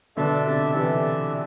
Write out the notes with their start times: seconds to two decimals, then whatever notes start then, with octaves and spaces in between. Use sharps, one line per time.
0.17 B2 D3 D4 A4 E5
0.46 C3
0.75 C3 E3 D4 A4 E5